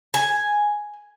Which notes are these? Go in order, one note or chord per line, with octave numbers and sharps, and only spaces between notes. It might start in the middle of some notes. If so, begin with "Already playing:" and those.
G#5